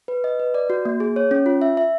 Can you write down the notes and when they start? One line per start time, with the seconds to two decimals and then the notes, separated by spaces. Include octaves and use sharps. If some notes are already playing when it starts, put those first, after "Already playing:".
0.08 B4
0.24 D#5
0.40 B4
0.54 D5
0.70 F#4
0.85 A#3
1.00 G#4
1.16 C#5
1.31 C#4
1.46 F4
1.61 E5
1.77 E5